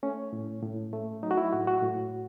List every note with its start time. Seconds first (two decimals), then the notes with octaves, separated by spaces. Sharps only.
0.03 A3 C#4
0.33 A2
0.63 A2
0.93 A3
1.23 F#3 D#4
1.31 F#4
1.37 E4
1.52 A2 F#4
1.67 F#4
1.83 A2